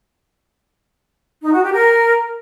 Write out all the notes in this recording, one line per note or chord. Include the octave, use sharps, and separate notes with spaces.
D#4
F#4
G4
A#4